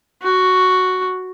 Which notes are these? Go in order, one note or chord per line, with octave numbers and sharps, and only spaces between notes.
F#4